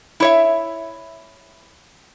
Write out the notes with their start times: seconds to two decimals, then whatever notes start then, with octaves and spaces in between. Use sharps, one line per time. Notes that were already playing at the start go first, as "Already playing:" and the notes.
0.20 E4 C#5 E5